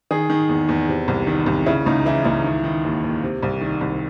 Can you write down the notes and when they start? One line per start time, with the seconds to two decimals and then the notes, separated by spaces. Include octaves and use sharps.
0.11 D#3 G#4
0.30 D#3
0.49 E2
0.68 E2
0.88 C3
1.08 C2
1.27 D#3
1.46 C2
1.66 C#3 E4
1.86 C#2 D#4
2.05 E3 E4
2.25 C#2 E4
2.44 D#3
2.64 D#3
2.84 D#2
3.04 D#2
3.23 C3
3.43 C2
3.61 D#3
3.81 C2